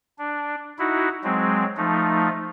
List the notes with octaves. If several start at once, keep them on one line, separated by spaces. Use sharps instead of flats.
D4
D#4 E4 F#4
F#3 G#3 C4
F3 A3 D#4